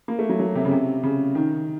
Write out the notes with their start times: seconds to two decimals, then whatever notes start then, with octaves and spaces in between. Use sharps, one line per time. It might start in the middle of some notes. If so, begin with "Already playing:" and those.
0.08 A#3
0.19 A3
0.29 F#3
0.39 F#3
0.55 C3
0.65 C#3
0.71 C3
1.03 C#3
1.35 D#3